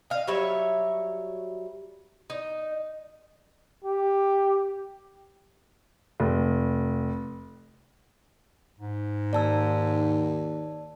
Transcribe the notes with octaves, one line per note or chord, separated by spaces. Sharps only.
D#5 F5
F#3 G3 C#5 E5
D#4
G4
F1
G#2
D#2 D5 A5 E6